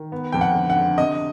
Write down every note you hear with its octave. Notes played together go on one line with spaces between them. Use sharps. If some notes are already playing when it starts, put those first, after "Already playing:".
Already playing: D#3
B3
F2 G5
F#5
D3
F#5
D3
C3 D#5